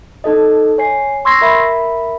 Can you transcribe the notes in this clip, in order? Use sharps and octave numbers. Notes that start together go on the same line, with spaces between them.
D#4 A4 D#5
C#5 G#5 C7
C6 C#6 E6 G#6 A#6 C7
A#4 E5 B5